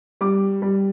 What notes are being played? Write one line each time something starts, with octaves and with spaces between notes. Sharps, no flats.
G3 D6
G3